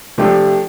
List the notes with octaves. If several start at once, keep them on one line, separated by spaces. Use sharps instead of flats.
C3 F3 A3 D4 G4